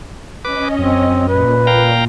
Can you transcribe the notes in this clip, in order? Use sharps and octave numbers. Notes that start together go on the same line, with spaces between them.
C#4 B4 D#5 D6
F#2 C4
A#2 B4
F5 G5 A#5